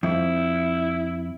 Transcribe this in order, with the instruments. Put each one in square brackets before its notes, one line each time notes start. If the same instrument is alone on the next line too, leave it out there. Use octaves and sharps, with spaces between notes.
[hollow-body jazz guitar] F2 [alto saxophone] E4